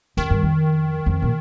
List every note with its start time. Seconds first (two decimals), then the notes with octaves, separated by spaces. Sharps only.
0.17 F2 D#3
0.30 G2
0.43 F2
1.06 F2
1.22 A#2